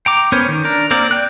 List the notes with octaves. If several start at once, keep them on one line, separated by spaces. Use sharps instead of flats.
G5 A#5 D6
B3 C#4 A#4 C5 C#5
D#3
D4 A#4
A#3 C4 A#4 D5
D5 G5 F#6